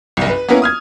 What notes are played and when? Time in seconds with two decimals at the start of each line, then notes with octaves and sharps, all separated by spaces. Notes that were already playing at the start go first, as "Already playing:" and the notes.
0.17 F#1 C2
0.30 B4
0.48 A#3 B3 C#4 E4 A#4 B4
0.62 D#6 F6 G#6